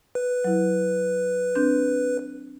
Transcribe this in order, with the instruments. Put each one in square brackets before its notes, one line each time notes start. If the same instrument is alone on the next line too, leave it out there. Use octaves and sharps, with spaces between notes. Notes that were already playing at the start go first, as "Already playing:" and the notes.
[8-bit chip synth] B4
[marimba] F#3 E4
C4 D4 G6